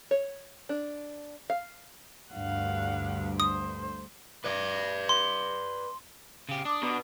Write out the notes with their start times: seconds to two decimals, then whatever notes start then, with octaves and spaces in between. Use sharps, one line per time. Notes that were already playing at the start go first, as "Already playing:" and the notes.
0.11 C#5
0.69 D4
1.50 F5
2.32 D2 G2 F5 F#5
3.40 C5 D#6
4.44 B4 D5
5.09 C6
6.49 C#3 G4 F5
6.65 D4 D6 D#6
6.83 B2